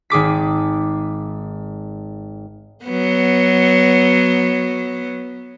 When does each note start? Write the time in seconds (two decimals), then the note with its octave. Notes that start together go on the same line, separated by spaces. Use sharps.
0.10 G#1 G#4 D6 B6
2.85 F#3 B3